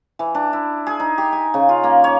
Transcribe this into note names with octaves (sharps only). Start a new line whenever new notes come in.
E3
D4
E4
G#4
D#4
G4
G#5
C#3
F4
A#3
C#5